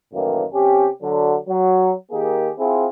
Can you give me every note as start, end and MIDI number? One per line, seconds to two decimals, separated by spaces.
0.14 0.44 42
0.14 0.44 45
0.14 0.44 51
0.14 0.44 52
0.14 0.44 58
0.54 0.88 48
0.54 0.88 61
0.54 0.88 67
1.03 1.36 50
1.03 1.36 54
1.48 1.92 54
2.12 2.50 51
2.12 2.50 58
2.12 2.50 67
2.12 2.50 68
2.59 2.87 60
2.59 2.87 64
2.59 2.87 65
2.59 2.87 68